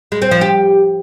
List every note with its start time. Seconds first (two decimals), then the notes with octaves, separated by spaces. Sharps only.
0.12 G#3
0.22 C4
0.31 F3
0.41 G4